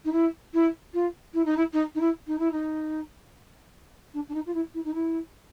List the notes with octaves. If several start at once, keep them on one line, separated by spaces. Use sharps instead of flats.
D#4
E4
E4
F4
E4
D#4
E4
D#4
D#4
E4
D#4
E4
D#4
D4
D4
D#4
F4
E4
E4
D#4
E4